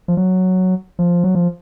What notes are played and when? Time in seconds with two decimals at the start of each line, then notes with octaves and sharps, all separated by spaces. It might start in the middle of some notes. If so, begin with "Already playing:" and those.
0.08 F3
0.17 F#3
0.99 F3
1.24 F#3
1.35 F3